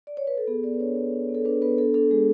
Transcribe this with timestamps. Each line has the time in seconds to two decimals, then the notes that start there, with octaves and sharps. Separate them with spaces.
0.07 D5
0.17 C#5
0.27 B4
0.37 A4
0.47 B3 G#4
0.64 B3 D5
0.74 B4
0.80 D4 C#5
0.96 B3
1.13 D4
1.29 B3
1.35 A4
1.45 D4 B4
1.62 B3 B4
1.78 D4 A4
1.94 D4 A4
2.11 G#3 G#4